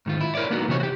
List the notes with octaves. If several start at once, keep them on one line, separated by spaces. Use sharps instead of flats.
G#2 D#3 F4
E4
E4 A#4 C#5 D5
A#3 B3 D#4 F#4
C3 E3 D#4 C#5
F#4 G4